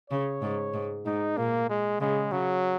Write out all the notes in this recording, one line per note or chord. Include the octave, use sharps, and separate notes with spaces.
C#3 C#5
G#2
G#2
G#2 D#4
A#2 A#3
G#3
C#3 G#3
C#3 F#3